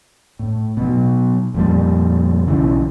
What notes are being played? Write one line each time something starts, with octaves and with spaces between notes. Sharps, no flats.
A2
B2 F#3
F2 A#2 G3
B1 C#3 E3